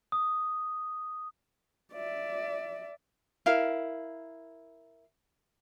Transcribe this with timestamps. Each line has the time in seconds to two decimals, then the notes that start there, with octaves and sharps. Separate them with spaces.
0.12 D#6
1.93 D5 E5
3.46 E4 A#4 F5